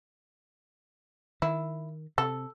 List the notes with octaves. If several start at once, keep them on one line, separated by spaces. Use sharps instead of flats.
D#3 E4
C3 A4